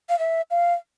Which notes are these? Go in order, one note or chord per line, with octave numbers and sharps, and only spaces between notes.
F5
E5
F5